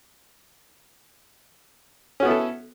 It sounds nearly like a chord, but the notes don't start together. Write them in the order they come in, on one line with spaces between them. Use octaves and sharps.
C#4 F#4 B3 E4 A4